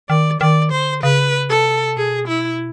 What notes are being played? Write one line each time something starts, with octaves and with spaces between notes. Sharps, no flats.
D#3 D5
D#3 D5
D3 C5
C#3 B4
C3 A4
B2 G#4
E4